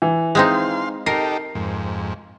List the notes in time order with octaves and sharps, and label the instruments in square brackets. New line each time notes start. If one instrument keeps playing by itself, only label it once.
[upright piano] E3
[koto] G#3 C4 D#4 [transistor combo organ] F5 C6
[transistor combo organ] D#4 G4 A4 [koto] A#4 [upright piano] C7
[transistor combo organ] F2 G#2